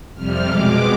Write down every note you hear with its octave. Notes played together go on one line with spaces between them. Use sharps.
F2 C3 G3 F6
B2 G#3 D6